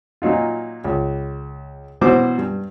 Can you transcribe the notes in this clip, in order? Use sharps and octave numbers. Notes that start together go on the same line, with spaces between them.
A#2 F#3 D#4 F4
C#2
B2 E3 F#3 F#4 C5 D6
G2